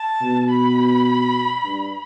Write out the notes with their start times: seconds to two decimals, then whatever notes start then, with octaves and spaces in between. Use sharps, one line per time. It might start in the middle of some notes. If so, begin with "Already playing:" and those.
Already playing: A5
0.21 B2
0.50 B5
1.64 G2